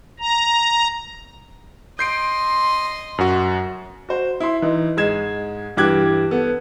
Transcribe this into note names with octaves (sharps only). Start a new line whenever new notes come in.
A#5
D#5 C6 G6 C7 D7
F#2 F#4
F#4 C5
E4 C6
E3 D#4
G#2 G#3 G#6 E7
G2 E3 G4 D6 F#6 G#6
B3 A4